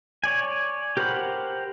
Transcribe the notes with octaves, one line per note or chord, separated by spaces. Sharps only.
C#5 D5 G#5
G4 A#4 C5 F#5 B5